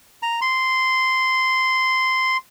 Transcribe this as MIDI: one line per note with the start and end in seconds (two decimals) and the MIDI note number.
0.22 0.40 82
0.41 2.37 84